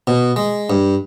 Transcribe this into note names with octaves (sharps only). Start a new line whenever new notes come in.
B2
G#3
G2